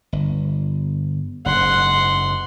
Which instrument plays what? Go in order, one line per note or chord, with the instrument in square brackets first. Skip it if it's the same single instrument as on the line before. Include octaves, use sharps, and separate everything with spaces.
[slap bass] G1
[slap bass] F#1 G#2 [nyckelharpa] F#5 C6